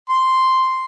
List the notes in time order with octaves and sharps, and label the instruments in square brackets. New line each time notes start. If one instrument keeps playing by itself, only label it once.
[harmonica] C6